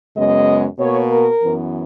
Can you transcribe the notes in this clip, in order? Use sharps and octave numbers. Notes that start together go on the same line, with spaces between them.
F#2 C#3 G#3 B3 D#5
B2 A#3 C#5
A#4
F#2 E3 B3